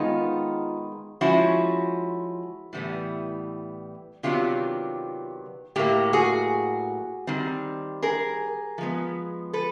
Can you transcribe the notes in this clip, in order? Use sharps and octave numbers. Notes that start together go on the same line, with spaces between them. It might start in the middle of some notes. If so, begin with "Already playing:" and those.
Already playing: D#3 G#3 B3 D#4 F4
F3 G#3 C#4 E4 F#4
A2 E3 G3 B3
C3 D#3 F#3 B3 D4 F4 G4
A2 F#3 A#3 G4
F#4 G#4
D#3 G3 C4
G#4 A#4
F3 G#3 B3
A4 B4